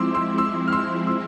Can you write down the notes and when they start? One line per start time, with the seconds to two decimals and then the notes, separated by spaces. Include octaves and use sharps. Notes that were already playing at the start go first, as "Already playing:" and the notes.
Already playing: F3 G#3 C4 E4 C6 D6 E6
0.15 C6 E6
0.38 C6 E6
0.68 F6
0.72 C6 E6
1.07 C6 E6